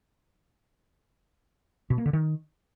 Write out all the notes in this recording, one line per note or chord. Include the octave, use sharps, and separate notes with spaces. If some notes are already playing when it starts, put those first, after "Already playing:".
B2
A#3
D3
D#3